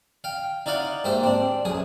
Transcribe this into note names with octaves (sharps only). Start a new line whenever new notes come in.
F5 G5
D#4 E4 D5 F5 F#5 C6
G#2 A#3 G4 C5 E5
C4 D4
B1 F#2 G#4 D#6